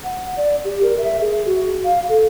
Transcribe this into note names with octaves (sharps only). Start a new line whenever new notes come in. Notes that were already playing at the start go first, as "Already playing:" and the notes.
F#5
D5
G4
A#4
E5
G#4
F#4
F5
A4